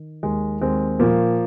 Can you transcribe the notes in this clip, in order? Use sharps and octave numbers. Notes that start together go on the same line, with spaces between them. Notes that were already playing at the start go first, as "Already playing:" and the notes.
Already playing: D#3
D#2 G#3
D#2 G#3 C4
A#2 F3 A#3